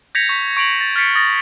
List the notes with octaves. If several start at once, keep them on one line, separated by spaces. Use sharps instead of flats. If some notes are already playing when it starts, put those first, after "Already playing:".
G6 G#6 A#6 B6 C#7 F7
C#6 B6
C#6 D7 F7 F#7
A6
F6 A6 B6 C#7 D7
D#6 A6 A#6